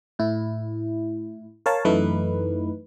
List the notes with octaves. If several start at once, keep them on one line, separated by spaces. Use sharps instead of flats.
A2 E4
A#4 C#5 F5 A5
F#2 E3 A3 D#4 B4